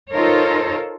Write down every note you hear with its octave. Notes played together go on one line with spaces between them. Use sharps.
D#4 F4 A4 A#4 C5 C#5